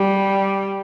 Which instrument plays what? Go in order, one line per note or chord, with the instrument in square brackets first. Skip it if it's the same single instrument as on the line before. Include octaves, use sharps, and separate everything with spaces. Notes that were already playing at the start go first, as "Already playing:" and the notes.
Already playing: [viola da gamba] G3